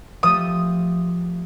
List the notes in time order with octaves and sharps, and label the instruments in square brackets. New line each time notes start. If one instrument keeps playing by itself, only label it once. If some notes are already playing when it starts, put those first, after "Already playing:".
[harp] F3 A3 G4 [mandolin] D#6